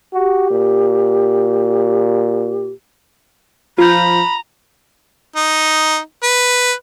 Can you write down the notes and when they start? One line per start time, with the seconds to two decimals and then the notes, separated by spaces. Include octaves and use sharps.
0.13 F#4 G4
0.51 A#2
3.78 F3 F4 A#5 B5 G6
5.36 D#4
6.23 B4